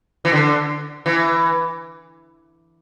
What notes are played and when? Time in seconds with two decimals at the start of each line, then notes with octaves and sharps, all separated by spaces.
0.25 E3
0.33 D3
1.06 E3